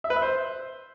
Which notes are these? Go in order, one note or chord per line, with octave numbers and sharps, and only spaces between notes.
E5
B4
E5
C5